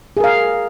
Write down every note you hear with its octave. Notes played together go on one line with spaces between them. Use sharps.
G#4 A#4 F5